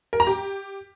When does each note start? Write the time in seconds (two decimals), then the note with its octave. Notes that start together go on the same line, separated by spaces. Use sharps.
0.13 A#4
0.20 A#5
0.27 G4